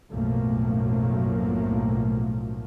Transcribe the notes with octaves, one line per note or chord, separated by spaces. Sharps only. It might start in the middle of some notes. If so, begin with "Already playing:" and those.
B1 F#2 A2 F3 A3 A#3